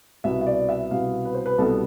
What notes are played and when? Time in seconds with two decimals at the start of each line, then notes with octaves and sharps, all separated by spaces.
0.24 C2 B2 B3 E5
0.41 E5
0.46 D5
0.69 E5
0.91 C2 B2 B3 F5
1.25 B4
1.35 C5
1.46 B4
1.58 C2 B2 G3 B3 A4